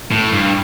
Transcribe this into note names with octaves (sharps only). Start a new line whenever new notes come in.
A2
G2